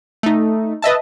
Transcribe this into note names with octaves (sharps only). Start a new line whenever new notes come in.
A3 D#4
B4 D#5 E5 A5